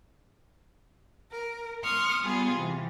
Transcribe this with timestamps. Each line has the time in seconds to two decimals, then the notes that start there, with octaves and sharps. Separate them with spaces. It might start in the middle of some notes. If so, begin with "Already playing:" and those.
1.31 A#4
1.83 C6 C#6 D#6 F6
2.23 G3 B3 F4 G#4
2.53 C3 E3